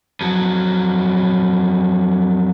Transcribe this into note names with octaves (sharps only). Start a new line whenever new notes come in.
F2 F#3